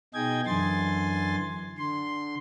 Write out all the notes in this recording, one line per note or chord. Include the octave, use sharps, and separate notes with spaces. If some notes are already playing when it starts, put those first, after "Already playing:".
B2 D#4 G#4 D#5 G5 G#6
F#2 D3 E3 G#5 C6 A6
D3 C6